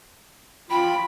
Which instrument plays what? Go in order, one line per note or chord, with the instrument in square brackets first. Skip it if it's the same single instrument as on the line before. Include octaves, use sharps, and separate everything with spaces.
[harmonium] F4 [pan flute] G5 [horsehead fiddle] B5